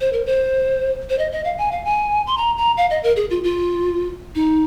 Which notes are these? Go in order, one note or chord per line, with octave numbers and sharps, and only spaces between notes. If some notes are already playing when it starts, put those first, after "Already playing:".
C5
A#4
C5
C5
D#5
D#5
F5
G#5
F5
G#5
C6
A#5
A#5
F5
D#5
A#4
G#4
F4
F4
D#4